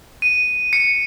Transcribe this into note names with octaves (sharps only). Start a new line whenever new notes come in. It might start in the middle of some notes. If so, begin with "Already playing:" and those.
D#7
C#7